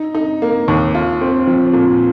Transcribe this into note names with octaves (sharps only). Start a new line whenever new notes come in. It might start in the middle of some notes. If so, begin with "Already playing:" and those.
Already playing: D#4
D#4
A#3
D#2
F4
C4
F3
A#2